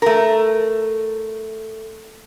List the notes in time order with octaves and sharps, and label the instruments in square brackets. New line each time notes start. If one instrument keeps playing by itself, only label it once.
[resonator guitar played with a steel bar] A3 A#4